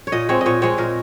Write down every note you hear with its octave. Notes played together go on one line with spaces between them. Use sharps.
C#5
A#2 D#5
G#3 C4 C#5
D#5
A#2 C#5
G#3 C4 C#5
A#2 A#4